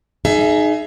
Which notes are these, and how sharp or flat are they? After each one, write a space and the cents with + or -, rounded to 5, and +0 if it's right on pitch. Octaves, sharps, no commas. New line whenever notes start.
D#4 -15 G#4 +25 E5 +25